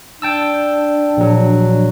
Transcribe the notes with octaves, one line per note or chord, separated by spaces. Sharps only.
D4 G5 A5 E6
A#1 F#3